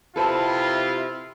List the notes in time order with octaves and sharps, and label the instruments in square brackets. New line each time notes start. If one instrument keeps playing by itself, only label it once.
[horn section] C3 E4 F4 [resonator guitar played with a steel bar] A4 B4 C5